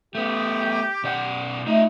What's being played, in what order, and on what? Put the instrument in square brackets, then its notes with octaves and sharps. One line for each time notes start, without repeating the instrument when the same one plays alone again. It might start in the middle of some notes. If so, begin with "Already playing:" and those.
[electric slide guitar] A3 B3 [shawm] G4
[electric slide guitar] B2 D5 F#5
[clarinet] A3 [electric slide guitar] D#4 F4 D#5